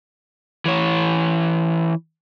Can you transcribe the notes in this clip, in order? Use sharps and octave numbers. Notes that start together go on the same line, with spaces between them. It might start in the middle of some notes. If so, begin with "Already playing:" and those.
E3 C#5